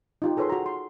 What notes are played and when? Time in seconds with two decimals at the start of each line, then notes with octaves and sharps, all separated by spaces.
0.22 D#4 F4 G4
0.37 G#4 A4 B4 C#5 B5 C6
0.49 F#4 A#5
0.66 C6